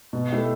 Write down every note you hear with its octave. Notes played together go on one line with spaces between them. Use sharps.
B2
A3 E4 G4